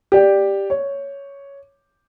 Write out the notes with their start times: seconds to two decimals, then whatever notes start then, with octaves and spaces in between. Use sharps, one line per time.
0.12 G4 D5 G5
0.70 C#5